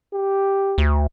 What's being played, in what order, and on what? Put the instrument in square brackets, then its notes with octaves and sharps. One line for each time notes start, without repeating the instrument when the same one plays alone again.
[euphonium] G4
[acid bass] D2